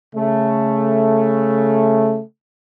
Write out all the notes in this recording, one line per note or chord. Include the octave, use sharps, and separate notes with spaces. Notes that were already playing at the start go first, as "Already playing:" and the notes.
C#3 A3